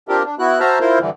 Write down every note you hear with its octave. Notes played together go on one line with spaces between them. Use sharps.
C4 D4 F4 G4 A#4
D4
B3 E4 F#4 F#6
F#4 C5 E5 A5 A#5 F6
E4 F4 A#4 C5
G2 D3 E3